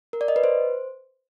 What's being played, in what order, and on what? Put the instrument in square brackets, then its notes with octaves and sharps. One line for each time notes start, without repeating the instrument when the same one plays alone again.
[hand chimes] A#4
D5
D#5
B4
C5